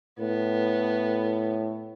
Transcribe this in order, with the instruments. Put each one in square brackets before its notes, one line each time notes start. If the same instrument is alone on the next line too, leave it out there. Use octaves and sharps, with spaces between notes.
[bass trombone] A2 [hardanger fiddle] B3